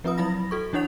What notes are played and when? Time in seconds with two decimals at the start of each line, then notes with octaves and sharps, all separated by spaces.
0.04 F3 C4 F4 B4 D#6
0.18 F#3 E4 B5 A#6
0.51 F#4 A4 C#6
0.73 E3 D4 E4 C#5 F#5 F7